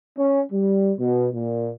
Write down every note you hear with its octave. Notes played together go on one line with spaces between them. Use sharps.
C#4
G3
B2
A#2